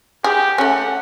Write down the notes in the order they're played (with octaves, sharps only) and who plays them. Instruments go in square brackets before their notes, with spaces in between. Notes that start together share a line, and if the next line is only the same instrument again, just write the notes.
[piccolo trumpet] G4 [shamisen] G#4
[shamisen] A3 C#4 [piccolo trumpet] F#5